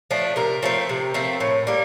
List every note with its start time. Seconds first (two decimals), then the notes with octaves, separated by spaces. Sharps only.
0.11 F3 A3 D4
0.36 C3 A#4
0.63 F3 A3 C4
0.89 C3
1.14 F3 A3 C4
1.40 A2
1.67 G3 A#3